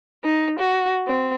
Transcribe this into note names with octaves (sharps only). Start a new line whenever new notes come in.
D#4
F#4
C4